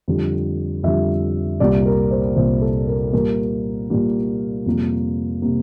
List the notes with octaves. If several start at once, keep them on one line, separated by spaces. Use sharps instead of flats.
F2 D3 G3
F2 D3 G3 E5
C2 A#2 G3 A#3 D5
A#4
C5
C2 A#2 G3 A#3 C5
A4
A#4
A#2 G3 A#3 A#4
A#2 G3 A#3
F2 C3 G3 A#3
C3 G3 A#3